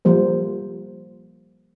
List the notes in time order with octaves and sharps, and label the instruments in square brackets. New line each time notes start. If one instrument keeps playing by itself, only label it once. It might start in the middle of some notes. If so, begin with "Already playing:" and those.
[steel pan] F3 G3 A#3 C5